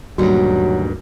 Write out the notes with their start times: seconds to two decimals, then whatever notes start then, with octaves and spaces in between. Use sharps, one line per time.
0.18 D2 G2 A#2 D#3 F#3 G3 F#4